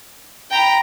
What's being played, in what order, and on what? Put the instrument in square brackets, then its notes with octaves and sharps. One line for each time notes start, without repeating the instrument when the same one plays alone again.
[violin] G5 [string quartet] A#5 B5